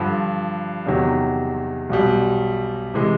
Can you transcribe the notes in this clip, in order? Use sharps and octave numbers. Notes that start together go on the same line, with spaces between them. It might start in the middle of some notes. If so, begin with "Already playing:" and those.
Already playing: G2 D3 F3
E2 C3 D#3 F#3
B1 B2 G3
C3 E3 G#3